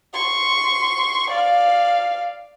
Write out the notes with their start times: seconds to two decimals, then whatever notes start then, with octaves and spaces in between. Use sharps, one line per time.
0.13 C6 C#6
1.30 D5 F5